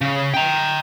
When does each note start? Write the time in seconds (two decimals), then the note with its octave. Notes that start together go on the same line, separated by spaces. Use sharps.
0.01 C#3
0.34 G5 A#5